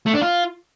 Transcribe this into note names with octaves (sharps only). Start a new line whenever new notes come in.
A3
D4
F4